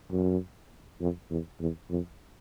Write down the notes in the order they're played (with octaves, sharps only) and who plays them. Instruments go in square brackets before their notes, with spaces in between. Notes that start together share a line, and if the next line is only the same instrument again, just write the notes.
[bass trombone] F#2
F2
E2
E2
F2